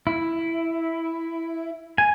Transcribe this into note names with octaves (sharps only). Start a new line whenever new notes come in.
E4
G#5